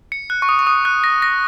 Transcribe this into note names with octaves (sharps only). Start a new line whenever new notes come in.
C#7
F#6
C#6
D#6
C#6
D#6
F#6
A#6
A#6